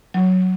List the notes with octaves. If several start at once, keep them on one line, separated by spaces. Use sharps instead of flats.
F#3